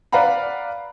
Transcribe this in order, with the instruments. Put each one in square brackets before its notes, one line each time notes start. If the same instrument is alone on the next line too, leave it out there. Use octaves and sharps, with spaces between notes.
[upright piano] B4 D5 F5 F#5 A#5 B5